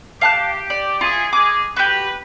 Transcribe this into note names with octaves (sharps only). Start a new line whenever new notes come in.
G4 F5 A5 F#6
D5
E4 F4 G#4
G#3 G#4 D6
F#4 G4 B4